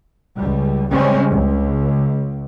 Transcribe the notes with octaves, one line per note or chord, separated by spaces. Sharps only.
C#2 G3
C#3 G3 G#3 C4 C#4
C#2